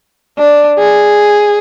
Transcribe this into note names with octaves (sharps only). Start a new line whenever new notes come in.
D4
G#4